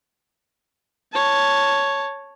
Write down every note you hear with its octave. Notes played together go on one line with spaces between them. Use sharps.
C#5 A5